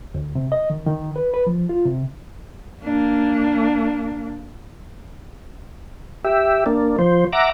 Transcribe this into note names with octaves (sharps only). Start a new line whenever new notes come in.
D2
C3
D#5
D#3
D#3
B4
B4
F3
F4
C3
A#3 D4
G4 E5
A#3 D4
F3 C5
E5 F#5 A#5 D6